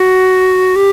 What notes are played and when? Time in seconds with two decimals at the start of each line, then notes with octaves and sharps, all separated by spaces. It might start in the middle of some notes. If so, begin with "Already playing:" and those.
Already playing: F#4
0.76 G4